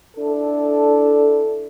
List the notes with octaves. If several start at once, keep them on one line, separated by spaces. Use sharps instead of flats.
D4 E4 A4